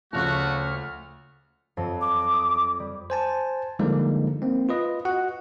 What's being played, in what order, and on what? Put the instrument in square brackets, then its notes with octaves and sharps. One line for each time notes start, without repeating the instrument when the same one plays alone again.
[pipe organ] D2 A3 F6 [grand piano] C#3 F3 [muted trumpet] F#4
[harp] F2 F#3
[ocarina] D6
[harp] D#6
G3
[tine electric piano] C5 G#5 A5
D3 F3 G3 G#3 A#3 D#4
A#3 C4
F4 B4 D#5
F#4 F#5